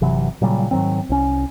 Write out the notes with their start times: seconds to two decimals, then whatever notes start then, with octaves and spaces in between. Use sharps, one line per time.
0.01 G1 C3 E3 F#3
0.42 A#2 C#3 F#3 G3
0.71 G#2 D#3 F#3 C4
1.09 C2 C#4